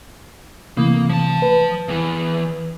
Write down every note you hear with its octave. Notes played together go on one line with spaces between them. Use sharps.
C3 E3 A3 A#3
F3 A5
B4
E2 E3